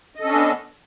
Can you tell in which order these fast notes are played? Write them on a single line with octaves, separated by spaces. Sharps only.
D#5 A4 C#4 D4 B3